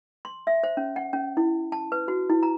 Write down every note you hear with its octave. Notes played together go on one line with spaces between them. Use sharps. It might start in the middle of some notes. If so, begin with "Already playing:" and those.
C6
E5
C5
C#4
F#5
C#4
E4
A5
B4
F#4
E4
A#5